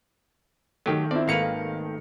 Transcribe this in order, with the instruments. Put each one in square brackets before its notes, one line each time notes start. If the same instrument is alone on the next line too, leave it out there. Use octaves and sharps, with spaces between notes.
[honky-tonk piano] D#3 A3 [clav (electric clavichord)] F#3 G4
[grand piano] C4 E4 [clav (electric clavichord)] D5
[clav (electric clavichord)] G#1 A#3 B4 [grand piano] F5 C#7 F7